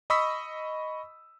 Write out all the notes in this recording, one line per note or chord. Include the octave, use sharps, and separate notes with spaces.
D#5 B5 C#6 D#6 E6 B6